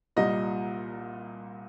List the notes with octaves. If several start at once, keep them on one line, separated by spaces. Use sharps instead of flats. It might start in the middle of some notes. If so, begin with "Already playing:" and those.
C2 A#2 G3 D#5